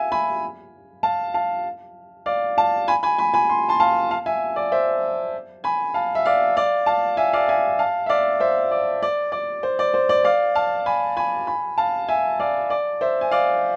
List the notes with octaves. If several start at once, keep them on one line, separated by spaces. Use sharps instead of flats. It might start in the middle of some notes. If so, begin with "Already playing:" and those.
Already playing: E5 F5 G#5
G#5 B5
F5 A5
F5 A5
D5 F5
F5 A5
G#5 B5
G#5 B5
G#5 B5
G#5 B5
C6
A5 C6
F5 A5
F5 A5
E5 G#5
D5
C5 E5
G#5 B5
F5 A5
E5
D5 F5
D5 F5
F5 A5
E5 G#5
D5 F5
E5 G#5
F5 A5
E5
D5 F5
C5 E5
D5
D5
D5
C5
D5
C5
D5
D5 F5
F5 A5
G#5 B5
G#5 B5
G#5 B5
F5 A5
E5 G#5
D5 F5
D5
C5 E5
G#5
D5 F5